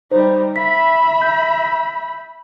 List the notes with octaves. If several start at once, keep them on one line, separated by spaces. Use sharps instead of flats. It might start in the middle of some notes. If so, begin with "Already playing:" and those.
G3 D#4 C5
E5 B5 B6
G6